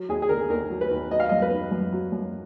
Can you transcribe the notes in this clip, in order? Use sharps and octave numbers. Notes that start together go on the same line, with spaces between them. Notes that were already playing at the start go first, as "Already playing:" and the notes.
Already playing: F#3
D#2 G#4
G#4
D3 A#4
D#2 A#4
F#3
B4
D#2
F#3 D#5
F5
F#2 D#5
B4
D#3
F#2
F#3
F#2